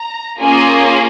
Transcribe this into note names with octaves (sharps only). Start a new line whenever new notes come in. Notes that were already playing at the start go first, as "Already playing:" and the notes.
Already playing: A#5
A#3 C#4 F4 G#4 G#5